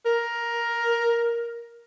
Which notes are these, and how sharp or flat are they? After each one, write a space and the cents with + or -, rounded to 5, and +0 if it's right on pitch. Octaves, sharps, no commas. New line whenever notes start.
A#4 +10